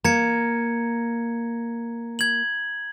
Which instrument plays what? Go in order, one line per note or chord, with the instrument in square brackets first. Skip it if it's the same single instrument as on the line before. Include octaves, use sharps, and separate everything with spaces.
[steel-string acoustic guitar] A#3 [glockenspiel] A#5 G#6 C#7
[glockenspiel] G#6 F#7